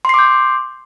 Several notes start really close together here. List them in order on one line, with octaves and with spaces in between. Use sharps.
C6 C7 D6 G6